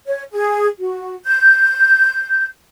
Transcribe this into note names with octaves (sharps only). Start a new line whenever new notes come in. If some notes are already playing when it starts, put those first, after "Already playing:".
C#5
G#4
F#4
G6